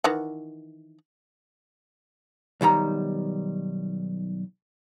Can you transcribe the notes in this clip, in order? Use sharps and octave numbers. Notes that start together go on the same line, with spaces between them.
D#3 E3 F#5
B1 D#3 G3 A#5